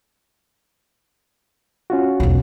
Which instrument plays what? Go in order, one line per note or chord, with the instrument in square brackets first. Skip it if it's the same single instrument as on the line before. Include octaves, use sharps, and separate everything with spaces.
[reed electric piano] C#4 F4 F#4
[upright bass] B1 E2